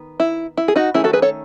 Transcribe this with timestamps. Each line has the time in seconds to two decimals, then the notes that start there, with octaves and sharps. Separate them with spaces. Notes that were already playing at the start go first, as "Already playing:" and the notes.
Already playing: D#3 B3
0.20 E4
0.57 E4
0.68 G#4
0.76 D#4 F#4
0.94 D#3 A3 C#4 E4 G#4
1.04 F#4 A4
1.13 G#4 B4
1.22 A4 C#5